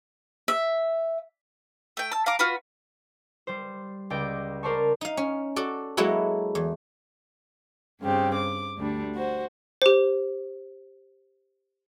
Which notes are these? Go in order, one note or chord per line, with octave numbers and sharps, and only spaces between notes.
E5
A3 G5
A5 E6
F5 A#5 D6
F4 F#4 B4
G3 C5
C#2 D5 G5 A#6 D7
C#4 A#4 C5 D5 A5 C#6
D#4 F5
C#4
F#4 A4 D5
F#3 G#3 A#3 E4 F#4 A4
E2
G2 C#3 C4 G4
D6
D2 G3 D4
F#4 C5
G4 C5